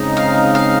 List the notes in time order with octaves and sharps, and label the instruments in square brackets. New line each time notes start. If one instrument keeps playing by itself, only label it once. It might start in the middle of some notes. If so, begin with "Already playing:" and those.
Already playing: [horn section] C#3 G#3 C4 D#4
[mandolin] F5
F5